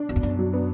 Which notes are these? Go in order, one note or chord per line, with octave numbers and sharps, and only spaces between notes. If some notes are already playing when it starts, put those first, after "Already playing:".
Already playing: D4
E2 B2
F2
F#2 B2
F#3
B3